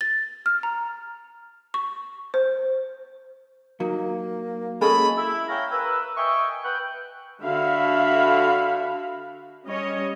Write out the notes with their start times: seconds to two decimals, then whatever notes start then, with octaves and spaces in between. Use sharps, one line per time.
0.01 A6
0.46 F6
0.63 A#5
1.74 C#6
2.34 C5
3.80 F#3 A#3 D#4
4.81 G#3 A#3 C#4 G#4 A4 B5
5.17 E4
5.49 C#5 E5 F5 G5 G#5 A#5
5.72 A#4 B4 E6
6.17 D#5 E5 G5 G#5 C#6
6.64 B4 F#5 G5
7.42 D3 F#4 E5 F5 B5
9.67 G3 C#4 C#5 D#5